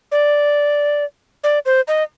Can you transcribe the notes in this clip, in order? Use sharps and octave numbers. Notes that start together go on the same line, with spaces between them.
D5
D5
C5
D#5